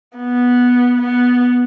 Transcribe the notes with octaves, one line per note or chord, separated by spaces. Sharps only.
B3
B3